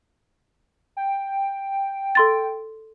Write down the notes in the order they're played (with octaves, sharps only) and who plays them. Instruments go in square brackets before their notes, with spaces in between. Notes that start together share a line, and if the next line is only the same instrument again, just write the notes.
[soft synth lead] G5
[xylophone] A4 C6 A6